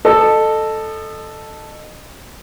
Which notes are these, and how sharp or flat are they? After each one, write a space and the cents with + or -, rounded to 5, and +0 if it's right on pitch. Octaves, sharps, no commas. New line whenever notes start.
A4 +0 D#5 -25